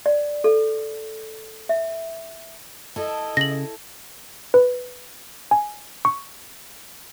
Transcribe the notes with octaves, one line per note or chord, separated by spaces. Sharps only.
D5
A4
E5
E4 A4 D#5
C#3 A#6 F#7
B4
G#5
C#6